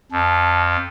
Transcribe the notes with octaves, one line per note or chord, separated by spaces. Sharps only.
F2 A5